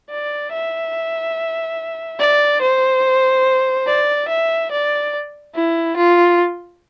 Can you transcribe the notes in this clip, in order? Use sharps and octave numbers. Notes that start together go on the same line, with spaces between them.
D5
E5
D5
C5
D5
E5
D5
E4
F4